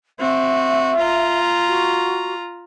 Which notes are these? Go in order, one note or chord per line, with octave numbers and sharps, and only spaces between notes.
C4 F#4 E5
F4 A#5
F#4